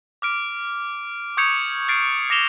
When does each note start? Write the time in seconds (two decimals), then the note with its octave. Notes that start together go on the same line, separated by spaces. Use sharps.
0.22 D6 F6 D7
1.37 C#6 D#6 G6 G#6 C#7 F7
1.88 F6 A6 C7 D7
2.30 D6 A#6 C7 E7 F7 G7